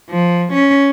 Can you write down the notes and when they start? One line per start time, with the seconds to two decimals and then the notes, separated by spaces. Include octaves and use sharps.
0.10 F3
0.53 C#4